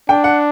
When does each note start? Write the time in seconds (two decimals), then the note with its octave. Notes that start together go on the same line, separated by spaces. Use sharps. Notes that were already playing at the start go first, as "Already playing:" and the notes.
0.09 D4 G5
0.24 F#5